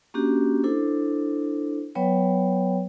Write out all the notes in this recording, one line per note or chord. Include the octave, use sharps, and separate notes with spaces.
A#3 C#4 D4 F#4 G4
D4 E4 A4 C5
F#3 B3 B4 C#5 G5